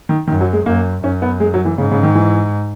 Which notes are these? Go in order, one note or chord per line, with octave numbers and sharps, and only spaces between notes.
D#3
F#2 D#3
F#3
G#3
F#2 A#3
F#2 C#4
B3
G#3
F#3
E3
G#2 C#3
C#3
D#3
E3